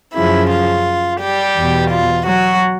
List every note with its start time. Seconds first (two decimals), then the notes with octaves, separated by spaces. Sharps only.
0.15 F#2 C#3 F3 E4
0.51 F4
1.21 G3 G4
1.56 E2 B2
1.92 F4
2.27 F#3 F#4